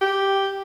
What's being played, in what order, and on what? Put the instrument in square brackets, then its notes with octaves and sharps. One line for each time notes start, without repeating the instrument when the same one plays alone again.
[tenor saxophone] G4